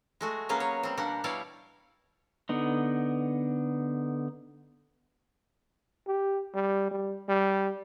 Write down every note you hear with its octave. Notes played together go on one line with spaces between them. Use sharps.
G#3 A3 F#4
F#3 A#3 B3 C#4 G#4 C#5
C#5
G3 C4
B2 G3 A#3 D4 F#5
B2 G3 E4 C#5 D5 F5
D3 B3 D#4
G4
G3
G3
G3